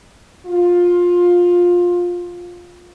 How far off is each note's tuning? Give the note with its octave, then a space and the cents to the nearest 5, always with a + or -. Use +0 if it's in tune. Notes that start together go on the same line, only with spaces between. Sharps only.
F4 +15